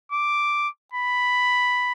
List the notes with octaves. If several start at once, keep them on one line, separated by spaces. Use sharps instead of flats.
D6
B5